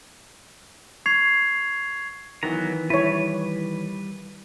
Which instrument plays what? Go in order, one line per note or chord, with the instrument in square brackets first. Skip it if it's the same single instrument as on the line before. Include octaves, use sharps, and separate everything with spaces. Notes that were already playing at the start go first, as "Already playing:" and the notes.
[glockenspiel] C#6 G#6 C7 F7
[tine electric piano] D#3 E3 [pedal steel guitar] F#3 B3 A#5
[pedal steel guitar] G3 B4 [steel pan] E4 C#5